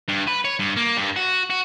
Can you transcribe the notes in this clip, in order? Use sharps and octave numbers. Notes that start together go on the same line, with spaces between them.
G2
B4
C#5
G2
A#3
G2
F#4
F#4